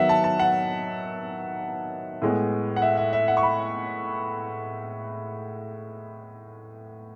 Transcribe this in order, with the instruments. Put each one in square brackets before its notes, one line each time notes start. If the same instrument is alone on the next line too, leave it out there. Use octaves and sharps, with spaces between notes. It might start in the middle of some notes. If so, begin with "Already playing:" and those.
Already playing: [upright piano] D#3 F#3 B3 E5 F#5
A5
A5
F#5
A2 G#3 B3
F#5
E5
E5
E5
F#5
C#6
B5